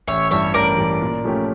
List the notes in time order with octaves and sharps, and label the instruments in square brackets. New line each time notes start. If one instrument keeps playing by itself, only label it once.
[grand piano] A1 [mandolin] C#5 E5
[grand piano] G2 E3 G3 [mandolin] C#5 E5
[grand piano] A1 [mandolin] A#4 D5
[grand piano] G2 E3 G3
A#2
F3 A3 C#4 G4